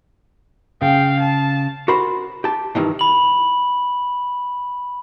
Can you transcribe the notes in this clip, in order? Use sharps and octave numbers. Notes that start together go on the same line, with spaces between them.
C#3 F5 G5
A5
F#4 A#4 C5 B5
G4 A5
G2 D#3 E3
B5 F#7